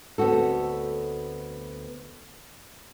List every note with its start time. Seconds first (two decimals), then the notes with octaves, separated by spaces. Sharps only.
0.18 D2 B3 C4 F#4 A4